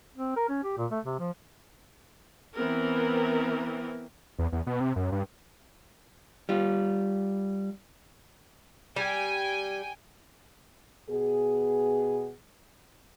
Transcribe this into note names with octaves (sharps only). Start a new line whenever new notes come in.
C4
A#4
C#4
G4
A#2
A3
C3
F3
E3 B3 C4 A#4
E2
E2
B2
C3
F#2
G2
G3 F4
G3 G5 G#5
B2 B3 G#4